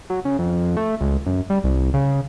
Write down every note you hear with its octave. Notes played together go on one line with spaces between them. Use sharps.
F#3
C#3
F2
A3
C#2
F#2
G3
C2
C#3